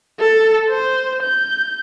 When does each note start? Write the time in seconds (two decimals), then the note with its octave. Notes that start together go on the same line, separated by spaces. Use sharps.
0.20 A4
0.69 C5
1.23 G6